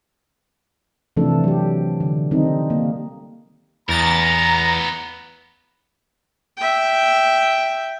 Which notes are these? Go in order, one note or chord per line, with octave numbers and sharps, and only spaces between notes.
C3 E3 F3 A3 D4 A4
F#3 G4
D3
D#3 G3 C4 D#4
A#3
E2 B3 A#4 A#5 A6
E5 G5